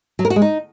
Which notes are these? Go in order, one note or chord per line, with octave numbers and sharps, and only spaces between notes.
F#3
A#4
F#4
G#3
D#4